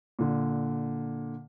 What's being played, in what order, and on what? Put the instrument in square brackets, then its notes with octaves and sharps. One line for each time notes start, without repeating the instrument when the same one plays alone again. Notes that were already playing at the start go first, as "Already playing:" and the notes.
[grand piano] A#2 D3